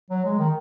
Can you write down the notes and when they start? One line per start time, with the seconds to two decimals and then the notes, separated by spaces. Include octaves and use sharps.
0.10 F#3
0.25 G#3
0.39 D#3